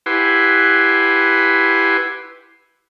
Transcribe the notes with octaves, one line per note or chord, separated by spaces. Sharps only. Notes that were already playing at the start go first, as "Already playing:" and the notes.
E4 G4 B4 F#5 G#5 C6